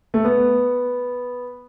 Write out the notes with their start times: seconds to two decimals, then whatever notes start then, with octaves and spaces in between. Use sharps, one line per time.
0.14 A3
0.25 B3